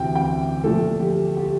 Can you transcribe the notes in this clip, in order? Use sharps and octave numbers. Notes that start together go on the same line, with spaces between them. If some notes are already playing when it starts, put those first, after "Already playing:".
Already playing: D2 C3 E3 C4 G5
G5
A#2 F3 A3 A4
G4
G4